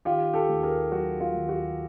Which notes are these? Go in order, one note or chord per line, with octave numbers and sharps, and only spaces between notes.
D#3 F4 G4
G4 A4
D#2
G#4 A#4
F#3 F#4
F4
D#2
F#4